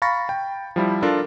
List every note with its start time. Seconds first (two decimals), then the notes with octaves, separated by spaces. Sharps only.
0.02 F5 A#5 B5 C#6 A6 A#6
0.29 G5
0.76 F3 G3 E4
1.02 D4 F4 A4 A#4